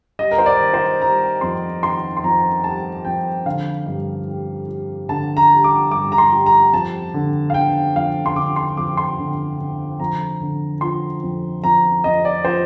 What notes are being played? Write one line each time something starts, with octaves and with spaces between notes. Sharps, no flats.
G3 D#5
A#4
C5
D5
D#3
C5
G3 A#5
F2 C6
D#3 C6
C6
F2 A#5
G3 A5
F2 G5
D3 F5
G2
G3
G3
D3 A5
A#5
G3
D6
G2 D6
A#5
C6
G3
A#5
F2 A5
D3
F5
D3 G5
F2 F5
C6
D3 D6
C6
F2 D6
C6
D3
D3
F2 A#5
D3
F3 C6
F2
F2 A#5
F2 D#5
D5
F3 C5